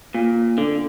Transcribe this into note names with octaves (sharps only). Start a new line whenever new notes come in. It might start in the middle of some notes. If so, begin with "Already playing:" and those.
A#2
D3